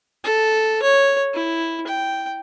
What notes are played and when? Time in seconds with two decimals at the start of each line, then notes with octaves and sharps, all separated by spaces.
0.24 A4
0.83 C#5
1.34 E4
1.87 G5